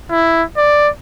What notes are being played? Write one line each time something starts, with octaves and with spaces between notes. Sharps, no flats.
E4
D5